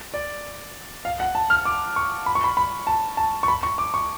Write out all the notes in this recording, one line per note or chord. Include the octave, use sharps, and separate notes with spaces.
D5
F5
F#5
A5
F6
D6
C#6
B5
C#6
B5
B5
A5
A5
C#6
B5
C#6
D6
C#6